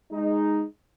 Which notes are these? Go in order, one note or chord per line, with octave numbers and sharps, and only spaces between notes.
G#3 D#4